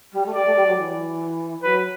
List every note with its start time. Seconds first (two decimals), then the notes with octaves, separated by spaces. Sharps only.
0.12 G3
0.25 A3
0.34 G3 D5
0.45 A3
0.56 G3
0.66 F#3
0.77 E3
1.63 F#3 B4